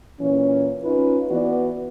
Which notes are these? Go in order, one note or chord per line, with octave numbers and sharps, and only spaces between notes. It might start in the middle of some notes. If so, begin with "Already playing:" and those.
A#2 E3 C#4
C#4 D#4 F4 B4
E3 B3 F#4 D5